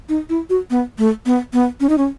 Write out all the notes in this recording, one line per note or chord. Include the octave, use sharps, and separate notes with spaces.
D#4
E4
F#4
B3
A3
B3
B3
C#4
D#4
C#4